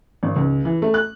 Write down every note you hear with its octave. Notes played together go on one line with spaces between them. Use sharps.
G#1
C#2
E3
A3
F#6